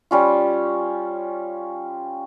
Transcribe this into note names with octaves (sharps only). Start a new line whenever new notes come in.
G3 C#4 F4